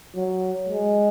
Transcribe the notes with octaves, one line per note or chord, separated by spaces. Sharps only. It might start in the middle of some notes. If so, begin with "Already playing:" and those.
F#3
G#3